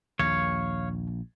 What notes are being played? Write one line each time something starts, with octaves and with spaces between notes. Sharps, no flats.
A#1 D#2 C#5 F5